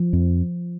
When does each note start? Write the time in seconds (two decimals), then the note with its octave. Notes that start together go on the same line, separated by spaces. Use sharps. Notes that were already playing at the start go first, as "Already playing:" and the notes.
Already playing: F3
0.13 F2